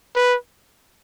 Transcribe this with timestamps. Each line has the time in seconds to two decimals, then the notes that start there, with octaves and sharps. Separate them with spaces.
0.16 B4